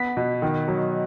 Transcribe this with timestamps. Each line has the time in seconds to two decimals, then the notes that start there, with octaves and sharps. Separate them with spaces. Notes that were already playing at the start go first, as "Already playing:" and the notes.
Already playing: B3 B6
0.17 B2
0.42 D#3
0.68 F#3